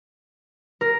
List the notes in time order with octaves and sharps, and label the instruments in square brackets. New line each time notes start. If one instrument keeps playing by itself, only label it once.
[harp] A#4